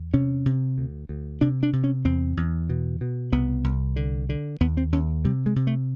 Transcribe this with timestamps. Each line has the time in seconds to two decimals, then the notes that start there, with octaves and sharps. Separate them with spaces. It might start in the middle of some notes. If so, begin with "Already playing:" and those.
Already playing: E2
0.14 C3 C#4
0.46 C3
0.78 D2
1.09 D2
1.41 C3 D4
1.63 D4
1.73 C3
1.84 C#4
2.05 E2 C4
2.37 E2
2.70 B2
3.01 B2
3.32 C2 B3
3.64 C2
3.96 D3
4.29 D3
4.61 D#2 B3
4.77 C4
4.92 D#2 C#4
5.25 C3 G3
5.46 G#3
5.56 C3
5.67 A3